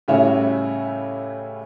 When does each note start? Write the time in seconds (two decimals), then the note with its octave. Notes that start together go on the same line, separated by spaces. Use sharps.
0.08 A2 C#3 G3 C#4 E4 F#4